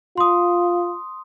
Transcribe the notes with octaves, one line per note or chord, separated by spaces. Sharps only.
F4 C6 D#6